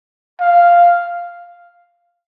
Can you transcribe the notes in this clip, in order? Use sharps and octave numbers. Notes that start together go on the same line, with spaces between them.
F5